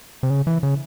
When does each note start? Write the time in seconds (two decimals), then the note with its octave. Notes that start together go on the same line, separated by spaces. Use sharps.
0.23 C3
0.30 C#3
0.47 E3
0.63 C#3